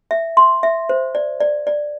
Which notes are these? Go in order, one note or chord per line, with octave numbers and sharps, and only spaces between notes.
E5
C6
E5
C5
D5
D5
D5